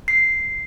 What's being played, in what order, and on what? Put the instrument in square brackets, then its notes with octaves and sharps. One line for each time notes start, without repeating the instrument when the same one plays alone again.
[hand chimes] C7